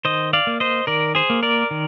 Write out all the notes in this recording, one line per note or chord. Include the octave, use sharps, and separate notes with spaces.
D#3 C5 D#5
D5 F5
A#3
C5 D#5
D#3 A#4 D5
G#4 C5
A#3
A#4 D5
D#3